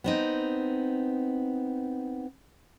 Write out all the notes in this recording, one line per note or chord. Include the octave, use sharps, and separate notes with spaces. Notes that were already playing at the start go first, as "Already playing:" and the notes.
B3 C4 D#4